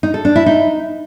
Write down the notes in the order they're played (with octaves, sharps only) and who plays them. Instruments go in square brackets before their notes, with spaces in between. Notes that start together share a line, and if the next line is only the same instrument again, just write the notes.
[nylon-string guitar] D#4
A4
D4
E4
D#4